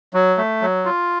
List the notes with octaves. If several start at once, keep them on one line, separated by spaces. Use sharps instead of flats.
F#3
A3
F#3
F4